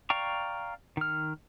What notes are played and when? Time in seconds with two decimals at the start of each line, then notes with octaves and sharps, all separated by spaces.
0.10 D5 F5 G5 A#5 C#6
0.97 D#3 F6